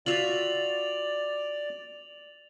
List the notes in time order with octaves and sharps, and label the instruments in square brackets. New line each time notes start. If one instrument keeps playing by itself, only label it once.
[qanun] F4 F#4 E5 [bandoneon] D5 [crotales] A6 F7 F#7